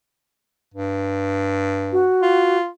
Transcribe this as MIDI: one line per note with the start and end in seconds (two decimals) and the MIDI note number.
0.74 2.07 43
1.92 2.58 66
2.22 2.68 65